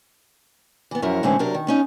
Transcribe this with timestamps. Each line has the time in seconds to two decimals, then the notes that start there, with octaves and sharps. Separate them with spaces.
0.91 E3 B3
1.02 F#2 F3 E4 A#4 F#5
1.23 A2 D3 E3 G#3 C4 C#4
1.39 C3 F#3 D4 A#4
1.54 D#3
1.67 B3 C#4 D#4